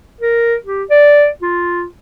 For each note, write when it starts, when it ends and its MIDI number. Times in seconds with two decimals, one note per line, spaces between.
0.21 0.55 70
0.65 0.83 67
0.90 1.28 74
1.42 1.86 65